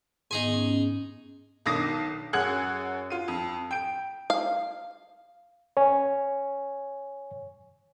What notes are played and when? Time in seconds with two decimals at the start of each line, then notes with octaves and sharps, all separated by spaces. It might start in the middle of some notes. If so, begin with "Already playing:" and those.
0.31 G#2 B3 D#4 G#4 G#5
0.54 C#4
1.66 B1 D#3 D4 D6 D#6 A#6
2.33 F#2 G#4 F#5 F#6 G#6 F#7
3.10 F4 D#7
3.28 F2
3.71 G5 D7
4.30 F5
5.77 C#5 G#5